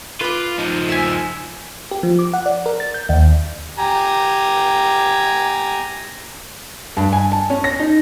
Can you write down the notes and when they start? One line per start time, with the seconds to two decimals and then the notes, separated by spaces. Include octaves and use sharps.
0.21 F4 B4 D6
0.59 F3 D#4
0.89 E5 G#5
1.91 G4
2.03 F3
2.19 D6
2.33 F#5
2.46 D5
2.66 A#4
2.80 A6
2.94 G6
3.09 D#2
3.79 G4 G#5 A#5
6.97 G2
7.13 G#5
7.32 A5
7.50 C#4
7.64 A#6
7.80 D#4